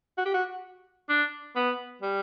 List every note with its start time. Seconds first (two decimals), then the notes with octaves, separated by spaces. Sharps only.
0.18 F#4
0.26 G4
0.34 F#4
1.09 D4
1.56 B3
2.02 G3